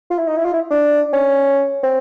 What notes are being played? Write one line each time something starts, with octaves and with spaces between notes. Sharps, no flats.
F4
E4
D#4
E4
F4
E4
D4
C#4
C4